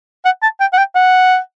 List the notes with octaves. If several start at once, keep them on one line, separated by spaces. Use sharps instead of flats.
F#5
A5
G5
F#5
G5
F#5